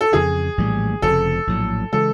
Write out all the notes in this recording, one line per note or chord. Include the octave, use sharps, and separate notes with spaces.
A4
F2 C#3 E3 G#4
A#1 A2 E3 G3
F1 F2 C#3 F3 A4
A#1 A2 F#3
C#3 E3 G#3 A4